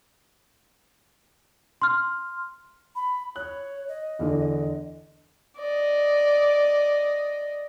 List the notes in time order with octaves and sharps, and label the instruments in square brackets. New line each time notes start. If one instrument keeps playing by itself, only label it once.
[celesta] C6 F6
[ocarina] B5
[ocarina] C#5 [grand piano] F#6
[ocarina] D#5
[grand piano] E2 D3
[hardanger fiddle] D5 D#5